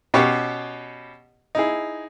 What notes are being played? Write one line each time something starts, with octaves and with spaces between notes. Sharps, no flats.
B2 C#4 G4 C#5
D#4 E4 G#4